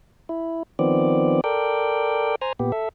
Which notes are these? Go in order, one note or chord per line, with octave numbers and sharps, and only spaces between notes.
E4
D#3 F3 B3 C4 D5
A4 A#4 D5 G5
C5 G#5 A#5
A#2 B3 G4
A4 E5